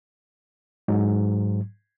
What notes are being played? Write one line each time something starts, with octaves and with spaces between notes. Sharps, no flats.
G#2 F#3